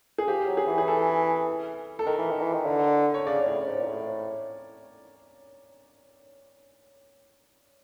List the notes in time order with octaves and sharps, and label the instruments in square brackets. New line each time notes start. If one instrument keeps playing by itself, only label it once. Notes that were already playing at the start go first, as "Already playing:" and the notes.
[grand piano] G#4
[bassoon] F3 [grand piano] G4
[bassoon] F#3
[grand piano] G#4
[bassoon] E3
[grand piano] G#4
A4
A4
[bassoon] D#3 [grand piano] A#4
[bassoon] E3
D#3
E3
D#3
D3
[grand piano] C#5
[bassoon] C#3 [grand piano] D5
[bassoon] A2
G#2
A#2
A2